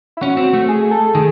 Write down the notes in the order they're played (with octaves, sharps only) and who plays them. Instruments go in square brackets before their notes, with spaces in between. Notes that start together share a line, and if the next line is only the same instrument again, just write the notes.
[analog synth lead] E4
[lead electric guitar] C#4 [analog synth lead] F#4
[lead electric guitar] C4
A3
[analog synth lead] G#4
A4
[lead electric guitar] D#3 [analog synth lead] G#4